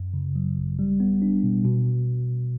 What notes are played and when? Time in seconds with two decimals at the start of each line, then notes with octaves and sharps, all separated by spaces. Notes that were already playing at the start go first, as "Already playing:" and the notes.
Already playing: F#2
0.14 C#3
0.35 F#3
0.57 G#1
0.79 G3
1.00 B3
1.22 D4
1.43 B2
1.65 B2